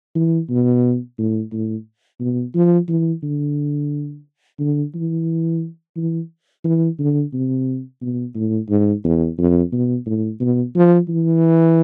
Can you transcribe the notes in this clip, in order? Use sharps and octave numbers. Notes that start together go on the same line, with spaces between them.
E3
B2
A2
A2
B2
F3
E3
D3
D3
E3
E3
E3
D3
C3
B2
A2
G#2
E2
F2
B2
A2
B2
F3
E3